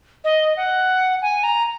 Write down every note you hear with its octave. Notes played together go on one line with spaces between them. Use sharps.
D#5
F#5
G#5
A#5